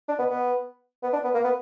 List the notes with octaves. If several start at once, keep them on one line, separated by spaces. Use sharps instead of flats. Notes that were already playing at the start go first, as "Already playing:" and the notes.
D4
B3
B3
B3
D4
B3
A#3
B3